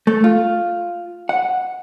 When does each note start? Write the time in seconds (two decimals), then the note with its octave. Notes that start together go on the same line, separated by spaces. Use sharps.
0.07 A3
0.24 F4
1.29 F#5